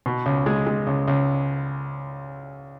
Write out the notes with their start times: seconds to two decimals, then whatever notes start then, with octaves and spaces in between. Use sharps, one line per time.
0.06 B2
0.26 C#2
0.46 G#3
0.67 G#3
0.87 C#2
1.08 C#2